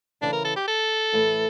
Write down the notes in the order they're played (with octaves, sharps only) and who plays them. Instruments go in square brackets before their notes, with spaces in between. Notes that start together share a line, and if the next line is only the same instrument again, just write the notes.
[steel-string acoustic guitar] C#3 E3 A3 [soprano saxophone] D4
[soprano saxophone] A#4
A4
G4
A4
[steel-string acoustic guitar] A2 E3 A3